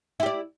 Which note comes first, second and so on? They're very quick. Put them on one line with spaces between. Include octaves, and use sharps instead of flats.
E4 G4 D5